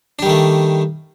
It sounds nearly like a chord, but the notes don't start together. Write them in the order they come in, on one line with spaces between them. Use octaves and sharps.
D4 G3 D#3 A3